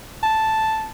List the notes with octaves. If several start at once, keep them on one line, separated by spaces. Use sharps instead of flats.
A5